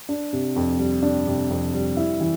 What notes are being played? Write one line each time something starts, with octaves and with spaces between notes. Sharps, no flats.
D4
C3
F2
G3
D4
C3
F2
G3
E4
E3